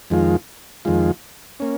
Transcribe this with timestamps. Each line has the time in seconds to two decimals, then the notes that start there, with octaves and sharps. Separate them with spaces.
0.10 F2 D#3 G#3 F4
0.85 F2 D#3 G#3 F4
1.60 A#3 C#4